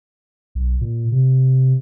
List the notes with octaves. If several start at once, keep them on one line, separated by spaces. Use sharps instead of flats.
B1
A#2
C3